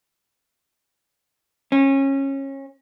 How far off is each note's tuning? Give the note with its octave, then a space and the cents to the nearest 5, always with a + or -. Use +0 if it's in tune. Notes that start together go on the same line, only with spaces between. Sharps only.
C#4 -25